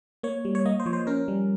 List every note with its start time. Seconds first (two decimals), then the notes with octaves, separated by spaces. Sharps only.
0.23 A#3 C#5
0.45 G3
0.55 C#5
0.66 A#3 D#5
0.80 C5
0.86 F3 C#5
0.93 C5
1.07 C#4 A#4
1.28 G3